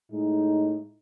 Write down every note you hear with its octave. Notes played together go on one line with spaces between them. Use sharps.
A2 G#3 D#4